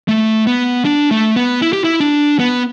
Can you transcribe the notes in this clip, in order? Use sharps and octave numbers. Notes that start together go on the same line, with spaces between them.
A3
B3
D4
A3
B3
E4
G4
E4
D4
B3